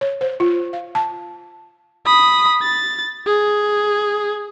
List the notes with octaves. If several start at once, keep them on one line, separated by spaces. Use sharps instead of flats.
C#5
C5
F4
F5
A5
B5 D#6
A6
G#4